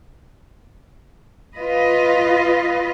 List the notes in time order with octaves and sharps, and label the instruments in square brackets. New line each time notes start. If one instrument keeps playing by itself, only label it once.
[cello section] F4 B4 D#5